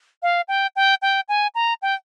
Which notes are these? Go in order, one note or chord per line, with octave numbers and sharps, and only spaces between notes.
F5
G5
G5
G5
G#5
A#5
G5